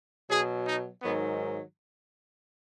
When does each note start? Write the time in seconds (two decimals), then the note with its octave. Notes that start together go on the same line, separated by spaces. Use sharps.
0.30 B2 F#3 G#4
0.67 D#4
1.02 G#2 D#3 F#3 B3